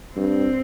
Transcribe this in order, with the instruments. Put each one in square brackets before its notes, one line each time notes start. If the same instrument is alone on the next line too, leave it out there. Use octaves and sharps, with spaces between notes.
[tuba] G2 [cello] C4